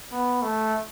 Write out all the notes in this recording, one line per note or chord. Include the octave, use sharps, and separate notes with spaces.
B3
A3